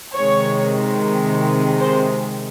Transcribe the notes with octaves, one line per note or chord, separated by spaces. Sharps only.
C3 D#3 G#3 C#5
C5